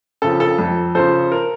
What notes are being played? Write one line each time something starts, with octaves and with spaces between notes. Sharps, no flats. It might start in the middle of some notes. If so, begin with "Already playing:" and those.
C#3 F3 A4
A4
F2
C#3 F3 A4 C5
A#4